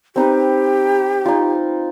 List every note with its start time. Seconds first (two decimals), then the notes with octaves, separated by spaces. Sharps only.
0.16 C4 D#4 G4 B4
1.25 D#4 F4